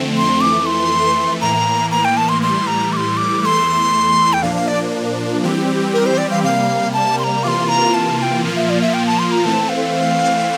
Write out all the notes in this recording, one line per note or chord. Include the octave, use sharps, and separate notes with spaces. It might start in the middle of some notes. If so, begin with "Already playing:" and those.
Already playing: F2 D3 A3 C4
C6
F2 E3 A3 D6
C6
A2 E3 A#3 A#5
A#5
G5
A5
C6
A2 E3 G3 C6
A#5
D6
C6
D6
E2 E3 A3 C6 D6
G5
A#2 F3 A#3 D4 F5
F5
D5
E3 G3 C4 G4
A#4
C5
D5
F5
C3 G3 A#3 F5
A5
C6
A#5
C3 E3 A#3 F4 C6 D6
A#5
A5
A5
G5
A#2 F3 A#3 F4
E5
D5
E5
G5
A5
C6
A#5
E3 A3 C4 A5
F5